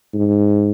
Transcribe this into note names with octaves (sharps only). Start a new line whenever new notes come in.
G#2